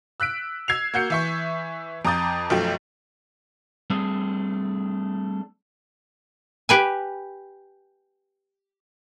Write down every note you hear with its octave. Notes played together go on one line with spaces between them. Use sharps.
E6 F#6 B6 D7
E6 G#6 C7 F7
A#3 F#4 G6 C7 C#7
E3 E5 C#6
F2 A#5 D6 D#6 G6 A6
B1 F#2 F3 A3 G5
G3 A3 C4 D4 G#4
G4 B4 G#5